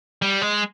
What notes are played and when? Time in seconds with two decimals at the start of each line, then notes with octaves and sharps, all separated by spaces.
0.22 G3
0.42 G#3